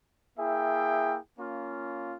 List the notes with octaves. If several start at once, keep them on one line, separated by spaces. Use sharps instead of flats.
A#3 E4 G#4 E5 G5
A#3 C#4 F4